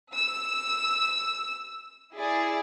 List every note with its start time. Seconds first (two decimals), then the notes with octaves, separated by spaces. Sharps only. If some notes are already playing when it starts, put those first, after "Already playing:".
0.12 E6
2.15 E4 G#4 D5